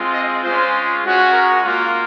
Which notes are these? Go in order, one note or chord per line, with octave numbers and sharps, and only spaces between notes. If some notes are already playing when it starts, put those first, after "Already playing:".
Already playing: G#3 C4 F4
D#5
G#3 C#4 F4 C5
G#3 C#4 F#4
A#4
A#3 F4